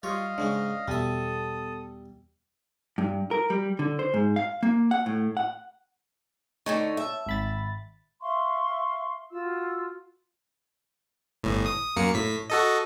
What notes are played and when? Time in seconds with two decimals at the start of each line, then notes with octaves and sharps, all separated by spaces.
0.03 G3 F4 C#5 D#5 F5
0.38 G#2 C#3 G#3 D4
0.88 E2 B2 G3 A4 E5 D#6
2.98 G2
3.31 A#4
3.50 G3
3.79 D3
3.99 C5
4.14 G#2
4.36 F5
4.63 A#3
4.91 F#5
5.06 A2
5.37 F#5
6.66 D3 A3 D#4 C#5 A5
6.97 E5
7.27 G#1 B5 A6
8.22 E5 F5 C6 C#6
9.32 F4 F#4 E6
11.43 G1 A2
11.66 D#6
11.96 F#2 A#3 C#7
12.14 A2 B6
12.50 F#4 A4 D#5